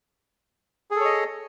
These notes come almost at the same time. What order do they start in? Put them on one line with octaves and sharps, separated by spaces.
G#4 A4 C#5 D#5